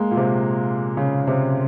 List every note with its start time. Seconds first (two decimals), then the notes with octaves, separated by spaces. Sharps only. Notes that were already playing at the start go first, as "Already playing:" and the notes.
Already playing: G#3 A#3
0.11 A#2
0.17 C3
0.97 C#3
1.27 C3